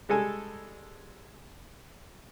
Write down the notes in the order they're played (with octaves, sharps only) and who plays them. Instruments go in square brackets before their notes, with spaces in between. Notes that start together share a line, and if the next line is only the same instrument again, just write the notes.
[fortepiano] G3 G#3 A4 G#5